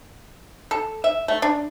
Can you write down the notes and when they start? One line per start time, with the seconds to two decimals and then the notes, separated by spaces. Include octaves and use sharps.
0.71 A4
1.04 E5
1.28 A3
1.42 D4